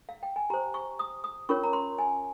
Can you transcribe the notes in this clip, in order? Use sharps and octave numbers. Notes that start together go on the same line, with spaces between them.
F5
G5
G#5
G4 C5 A#5
C#6
D#6
D#6
C#4 F4 A#4 C#5 C#6
A#5
C6
G#5